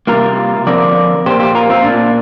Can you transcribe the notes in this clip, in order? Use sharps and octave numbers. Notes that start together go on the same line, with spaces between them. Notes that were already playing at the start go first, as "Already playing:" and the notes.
C3 G3 A#3 F4 A#4
D3 F3 C4 A#4 D5
A#2 A#3 G4 C5
G4 C5
F4 A#4
C4 F4
A#2 A#3 D4